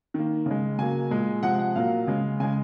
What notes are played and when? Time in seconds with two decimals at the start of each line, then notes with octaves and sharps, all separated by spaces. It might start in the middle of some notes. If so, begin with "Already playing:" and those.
0.14 D#3 A#3
0.46 C#3 G#3
0.79 C#3 F#3 A#3 G#5
1.11 A#2 G#3
1.43 C3 F3 G#3 F#5
1.59 F#5
1.75 A#2 F#3 A#3 F5
2.07 C#3 G#3
2.40 C#3 G#3 G#5